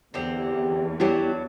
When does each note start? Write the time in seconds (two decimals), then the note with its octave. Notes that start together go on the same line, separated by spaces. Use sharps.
0.14 E2 D3 C4 G4
1.00 F#3 D4 E4 F#4 G4